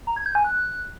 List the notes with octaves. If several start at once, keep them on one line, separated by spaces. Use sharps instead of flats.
A#5
G#6
G6
G#5
F#6